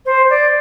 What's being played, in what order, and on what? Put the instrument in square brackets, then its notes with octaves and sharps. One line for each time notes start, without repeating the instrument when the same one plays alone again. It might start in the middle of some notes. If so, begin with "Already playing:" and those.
[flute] C5
D5